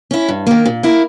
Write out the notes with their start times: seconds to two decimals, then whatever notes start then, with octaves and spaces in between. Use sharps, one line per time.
0.11 C#4 E4
0.29 G2
0.47 D#3 A#3
0.66 A#2
0.83 A#3 E4 A#4